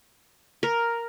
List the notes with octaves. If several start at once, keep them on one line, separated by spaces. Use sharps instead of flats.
A#4